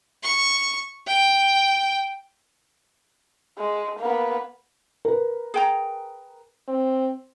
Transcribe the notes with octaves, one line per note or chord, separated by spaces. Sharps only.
C#6
G5
G#3
A#3 B3
A#4 B4
G#4 G5 A#5
C4